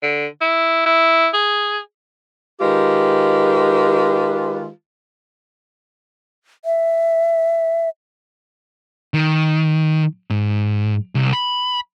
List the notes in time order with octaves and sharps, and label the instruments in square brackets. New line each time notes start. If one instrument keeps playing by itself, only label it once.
[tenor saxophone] D3
E4
E4
G#4
[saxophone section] D#3 G#3 F4 G4 B4
[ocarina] E5
[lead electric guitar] D#3
G#2
C2
B5